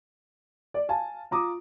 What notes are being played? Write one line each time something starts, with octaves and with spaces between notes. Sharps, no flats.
D5
F5 G#5 A5
F4 A#5 D6 D#6